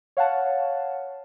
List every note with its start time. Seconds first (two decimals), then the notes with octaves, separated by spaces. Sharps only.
0.17 C#5 F5 F#5 A5